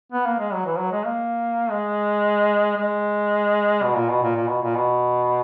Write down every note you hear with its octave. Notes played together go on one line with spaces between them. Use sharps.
B3
A#3
G#3
F#3
E3
F#3
G#3
A#3
G#3
G#3
B2
A#2
B2
A#2
A#2
B2
A#2
B2